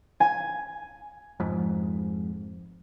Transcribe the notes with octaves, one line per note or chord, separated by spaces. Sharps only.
G#5
F2 G#2